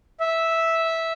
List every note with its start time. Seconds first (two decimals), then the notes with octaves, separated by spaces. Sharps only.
0.20 E5